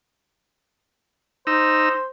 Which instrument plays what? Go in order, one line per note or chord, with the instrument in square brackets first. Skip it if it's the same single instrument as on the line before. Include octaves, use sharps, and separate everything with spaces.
[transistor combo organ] D#4 E6 [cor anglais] C5